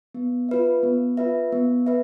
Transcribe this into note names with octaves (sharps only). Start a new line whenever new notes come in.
B3
F4 B4 E5
B3
F4 B4 E5
B3
B4 E5